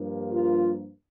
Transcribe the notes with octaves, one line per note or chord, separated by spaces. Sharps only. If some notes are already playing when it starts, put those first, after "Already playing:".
Already playing: G2 F3 A#3
F4